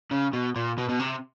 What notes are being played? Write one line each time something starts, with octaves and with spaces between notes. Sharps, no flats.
C#3
B2
A#2
B2
B2
C3